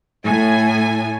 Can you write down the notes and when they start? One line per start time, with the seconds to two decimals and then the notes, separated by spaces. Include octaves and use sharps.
0.25 A2 G#5